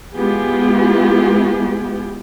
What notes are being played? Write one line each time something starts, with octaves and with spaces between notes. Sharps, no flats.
G#3 B3 E4 F4 G4 G#4